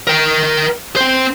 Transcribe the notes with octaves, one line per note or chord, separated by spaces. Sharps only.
A#4 G5
C4 C5